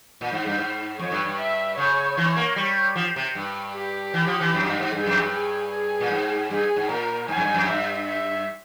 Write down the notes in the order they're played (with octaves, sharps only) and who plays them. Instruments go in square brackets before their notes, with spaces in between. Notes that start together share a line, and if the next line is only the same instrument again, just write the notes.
[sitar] A#2
G#2
G2
G#2
[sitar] F2 [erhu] C#5
[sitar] G2
G2
[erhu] E5
[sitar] C#3 [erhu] C#5
[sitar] E3
A#3
G3
F3
C3
G2
[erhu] G4
[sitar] E3
F3
E3
F2
G2
G#2
[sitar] G2 [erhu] G#4
[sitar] F2
G2
[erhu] G#4
G#4
[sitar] A#2
G#2
[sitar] G2 [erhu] G#4
[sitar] G#2
[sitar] A#2 [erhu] A#4
[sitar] G#2 [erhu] G#5
[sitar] F2
G2
F2
[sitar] G2 [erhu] E5
[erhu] E5